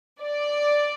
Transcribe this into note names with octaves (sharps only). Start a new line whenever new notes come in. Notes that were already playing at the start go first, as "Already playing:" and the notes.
D5